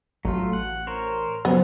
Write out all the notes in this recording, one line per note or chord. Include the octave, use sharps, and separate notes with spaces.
A1 F#3 A3 F4
F#5
A#4 C5 C#5
C#3 F3 F#3 B3